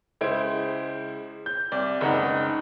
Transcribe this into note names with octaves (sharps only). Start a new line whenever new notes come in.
C#2 G#3 E4 C5 G#6 D7
G6
C2 D5
F#1 C#2 D#4 F#5 A#5